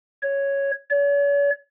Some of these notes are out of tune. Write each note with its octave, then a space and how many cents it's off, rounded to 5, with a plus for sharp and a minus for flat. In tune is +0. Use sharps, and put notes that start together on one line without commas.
C#5 +0
C#5 +40